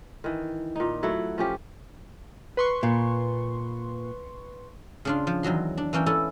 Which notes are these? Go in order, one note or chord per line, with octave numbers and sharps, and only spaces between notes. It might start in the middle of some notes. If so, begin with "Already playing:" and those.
D#3 E3
A#2 D#4
F#3 A3 E4
F3 C#4 G4
B4 C6 C#6
A#2
C#3 D4 F4
F3
E2 D#3 F#3 C6
D4
E3 A#3 C#4 G5
C#4 E4 A4 G#5